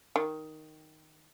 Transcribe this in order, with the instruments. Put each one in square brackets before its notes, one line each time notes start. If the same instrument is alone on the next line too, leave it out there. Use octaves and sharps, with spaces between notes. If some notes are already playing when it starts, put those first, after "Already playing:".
[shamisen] D#3